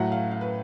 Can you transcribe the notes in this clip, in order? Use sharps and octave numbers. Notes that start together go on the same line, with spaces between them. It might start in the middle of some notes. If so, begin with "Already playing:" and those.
Already playing: A2 F#3 A3 F#5
F5
F5
B4